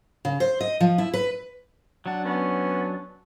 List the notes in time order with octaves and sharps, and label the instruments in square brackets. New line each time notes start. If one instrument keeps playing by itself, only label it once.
[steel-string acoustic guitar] C#3
C5
D#5
F3
E4
B4
[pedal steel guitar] F#3 D4 [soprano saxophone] F#5
[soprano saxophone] B3 [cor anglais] C#4